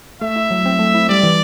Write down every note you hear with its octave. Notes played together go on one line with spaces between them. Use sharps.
A3 E5
E4
F#3
C4
A3
E4
G3 D5
E3